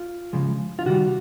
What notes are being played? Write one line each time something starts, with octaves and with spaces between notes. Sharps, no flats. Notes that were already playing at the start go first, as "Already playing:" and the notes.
Already playing: F4
C#3 F3 G#3
F4
C3 D#3 G3 F#4